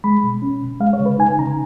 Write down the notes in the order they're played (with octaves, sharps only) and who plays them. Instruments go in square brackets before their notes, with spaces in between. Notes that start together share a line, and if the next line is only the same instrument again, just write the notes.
[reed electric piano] G#3 B5
B2
C#4
B2
G#3 F5
C#5
C#3
B4
D#4 G#5
C#3 A#5